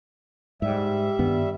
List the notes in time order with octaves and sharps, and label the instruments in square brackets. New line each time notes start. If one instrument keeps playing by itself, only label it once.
[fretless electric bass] G#2 [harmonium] G3 E5
[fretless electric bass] G2 D#3 B3